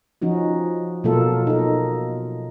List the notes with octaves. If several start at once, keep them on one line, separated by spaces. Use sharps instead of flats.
F3 C#4 D#4 F#4
B2 F#3 A#3 F4 A4
D#4 A4